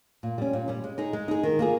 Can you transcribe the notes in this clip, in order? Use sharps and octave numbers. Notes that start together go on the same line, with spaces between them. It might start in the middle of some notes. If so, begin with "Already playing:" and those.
A#2
G3 C#4
A#2
G3 C#4
G#3
D#4 G#4
G#3
D#4 G#4
D#3
A#3 F4 G#4